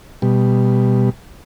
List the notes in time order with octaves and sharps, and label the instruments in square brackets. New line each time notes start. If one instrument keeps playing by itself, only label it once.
[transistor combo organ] B2 G3